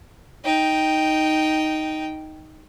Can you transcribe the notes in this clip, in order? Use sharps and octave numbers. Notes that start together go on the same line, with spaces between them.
D#4 G5